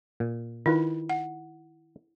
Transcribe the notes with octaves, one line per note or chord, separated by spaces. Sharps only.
A#2
D#3 E4 F4 B4
F#5